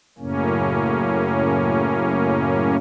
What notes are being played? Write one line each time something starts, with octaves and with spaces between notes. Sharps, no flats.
F#2 A2 C#3 A#3 C#4